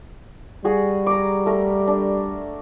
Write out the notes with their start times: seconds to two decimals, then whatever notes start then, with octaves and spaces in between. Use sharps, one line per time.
0.65 G3 F#4 G#4
1.06 A#5 D6
1.46 A3 A#4
1.87 D4